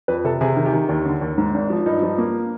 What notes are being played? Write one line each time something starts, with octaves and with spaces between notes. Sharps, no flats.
F2 B4
C3 A4
C3 G#4
D#3
G4
D#3
D#2
D3
D#2
G#2
G#1
F3
G2 D#4
F3
A#3